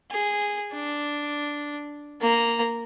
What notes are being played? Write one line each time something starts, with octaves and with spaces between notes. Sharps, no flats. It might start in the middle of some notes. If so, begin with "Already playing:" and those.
G#4
D4
A#3 A#5